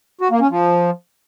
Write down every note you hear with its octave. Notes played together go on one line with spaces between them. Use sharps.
F#4
A#3
C#4
F3